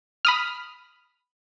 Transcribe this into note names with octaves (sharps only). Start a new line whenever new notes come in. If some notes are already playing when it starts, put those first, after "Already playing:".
B5 D#6 F6